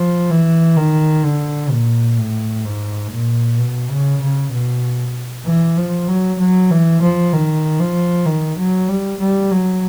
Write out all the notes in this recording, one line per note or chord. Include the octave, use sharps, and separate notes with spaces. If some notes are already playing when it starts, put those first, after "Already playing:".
Already playing: F3
E3
D#3
D3
A#2
A2
G#2
A#2
B2
C#3
C#3
B2
E3
F3
F#3
F#3
E3
F3
D#3
F3
D#3
F#3
G3
G3
F#3